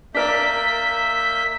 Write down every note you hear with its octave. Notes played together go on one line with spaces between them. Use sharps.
A#3 D4 A#4 D5 E5 G6 B6